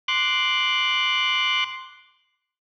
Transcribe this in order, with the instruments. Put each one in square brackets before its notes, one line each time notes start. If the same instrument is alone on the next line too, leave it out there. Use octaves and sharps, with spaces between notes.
[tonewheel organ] C6 D6 F#6